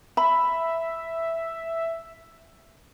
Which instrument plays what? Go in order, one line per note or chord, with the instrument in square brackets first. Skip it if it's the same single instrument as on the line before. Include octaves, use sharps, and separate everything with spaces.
[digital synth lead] E5 [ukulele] B5